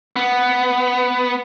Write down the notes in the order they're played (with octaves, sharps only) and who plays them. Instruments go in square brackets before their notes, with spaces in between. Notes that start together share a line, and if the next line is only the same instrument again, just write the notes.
[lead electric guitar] B3